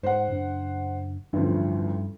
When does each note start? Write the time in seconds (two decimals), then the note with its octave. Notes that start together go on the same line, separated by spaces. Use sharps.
0.03 G#2 C5 F#5
0.28 F#1 D4
1.33 A1 D2 G2 F3